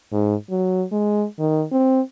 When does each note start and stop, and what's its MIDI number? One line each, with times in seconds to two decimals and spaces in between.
0.12 0.35 44
0.50 0.84 54
0.92 1.26 56
1.39 1.64 51
1.71 2.01 60